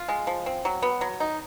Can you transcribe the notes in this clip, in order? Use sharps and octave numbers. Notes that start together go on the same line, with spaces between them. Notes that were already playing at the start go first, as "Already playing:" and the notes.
Already playing: F4
G#3
F3
C4
F#3
B3
F#3
D#4